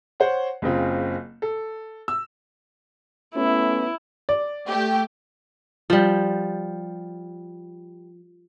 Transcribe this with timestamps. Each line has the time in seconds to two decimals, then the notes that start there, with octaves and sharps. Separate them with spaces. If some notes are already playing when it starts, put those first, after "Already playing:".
0.20 C5 C#5 F#5
0.62 F#1 C#3 C4 F4
1.42 A4
2.08 E6
3.35 A3 B3 C#4 E4
4.29 D5
4.68 A3 G4
5.90 F3 G3